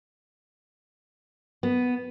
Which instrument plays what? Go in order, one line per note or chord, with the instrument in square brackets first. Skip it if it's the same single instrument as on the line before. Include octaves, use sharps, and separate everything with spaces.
[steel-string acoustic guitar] B3